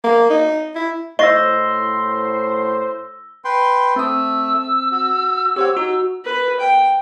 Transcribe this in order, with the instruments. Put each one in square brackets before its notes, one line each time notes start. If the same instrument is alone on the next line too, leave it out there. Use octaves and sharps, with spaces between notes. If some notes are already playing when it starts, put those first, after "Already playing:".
[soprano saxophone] A#3
D#4
E4
[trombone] A2 [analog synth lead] C5 [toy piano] D#5 C#6 [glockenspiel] E6 A#6 G7
[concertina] B4 G5 C6
[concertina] A3 [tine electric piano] C4 D#6 [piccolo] E6
[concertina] F#4
[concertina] C4 C#5 [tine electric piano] G4 C5 F#5
[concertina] D#4 [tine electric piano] F#4
[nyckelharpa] B4
G5